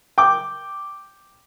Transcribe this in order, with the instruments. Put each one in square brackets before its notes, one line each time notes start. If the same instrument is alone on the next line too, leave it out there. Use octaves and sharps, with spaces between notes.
[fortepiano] G5 D6